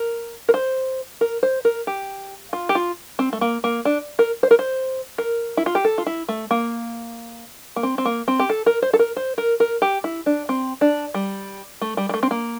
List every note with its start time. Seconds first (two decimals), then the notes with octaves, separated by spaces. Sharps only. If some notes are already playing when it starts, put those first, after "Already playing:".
Already playing: A#4
0.49 A#4
0.54 C5
1.21 A#4
1.43 C5
1.65 A#4
1.87 G4
2.53 F4
2.69 G4
2.75 F4
3.19 C4
3.33 A3
3.41 A#3
3.64 A#3
3.85 D4
4.19 A#4
4.43 C5
4.51 A#4
4.59 C5
5.18 A#4
5.57 E4
5.66 F4
5.75 G4
5.85 A4
5.98 F4
6.06 E4
6.29 A3
6.51 A#3
7.76 A#3
7.83 C4
7.98 C4
8.05 A#3
8.28 C4
8.40 G4
8.49 A4
8.66 A#4
8.82 C5
8.93 A4
8.99 A#4
9.16 C5
9.38 A#4
9.60 A#4
9.82 G4
10.04 E4
10.26 D4
10.49 C4
10.81 D4
11.14 G3
11.81 A3
11.97 G3
12.09 G3
12.14 A3
12.23 C4
12.31 A#3